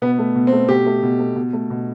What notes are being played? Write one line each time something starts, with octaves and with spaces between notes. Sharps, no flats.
B2 B3
A3
B2
C4
A3
B2 G4
A3
B2
A3
B2
A3
B2